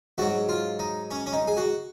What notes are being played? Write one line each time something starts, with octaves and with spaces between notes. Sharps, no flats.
G#2 F#3 F#4
F4
D#4
C#4
C#4
D#4
G#4
F#4